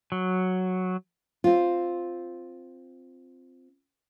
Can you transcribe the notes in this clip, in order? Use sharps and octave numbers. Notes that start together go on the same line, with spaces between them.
F#3
C4 F4